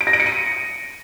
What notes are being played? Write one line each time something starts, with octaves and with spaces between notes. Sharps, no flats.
D7
A#6
D7
C#7
D#7